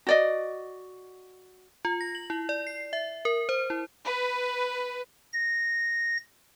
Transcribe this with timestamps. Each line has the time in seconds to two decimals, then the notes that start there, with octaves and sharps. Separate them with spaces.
0.07 F#4 D5 D#5
1.85 F4
2.01 A#6
2.15 F#7
2.30 E4
2.49 D5
2.67 C7
2.93 E5
3.25 A#4
3.49 C5
3.70 E4
4.04 B4
5.33 A#6